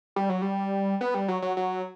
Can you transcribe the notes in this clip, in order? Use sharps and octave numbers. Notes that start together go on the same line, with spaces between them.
G3
F#3
G3
B3
G3
F#3
F#3
F#3